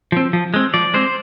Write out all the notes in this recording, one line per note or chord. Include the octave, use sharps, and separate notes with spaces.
F3 C4
F3
G#3 C4
F3 D5
G#3 C4 C5